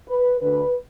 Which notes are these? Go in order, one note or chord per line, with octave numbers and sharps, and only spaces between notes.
B4
D2 D3 B4